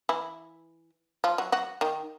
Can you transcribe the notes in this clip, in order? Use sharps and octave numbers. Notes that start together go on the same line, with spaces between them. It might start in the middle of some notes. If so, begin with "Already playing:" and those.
E3 E4
F3 F4
F#3 F#4
F#3 F#4
D#3 D#4